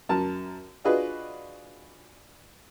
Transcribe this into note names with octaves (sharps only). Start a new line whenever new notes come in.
F#2 A#4 A5
D4 F4 F#4 G#4 B4 D#5